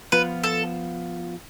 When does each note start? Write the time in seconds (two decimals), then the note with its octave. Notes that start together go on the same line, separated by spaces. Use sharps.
0.12 F3 B3 F4 B4
0.44 A4